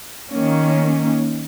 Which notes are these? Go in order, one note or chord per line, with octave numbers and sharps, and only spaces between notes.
D#3 A#3 C#4